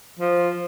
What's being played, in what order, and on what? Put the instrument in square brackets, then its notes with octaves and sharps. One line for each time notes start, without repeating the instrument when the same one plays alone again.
[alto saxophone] F3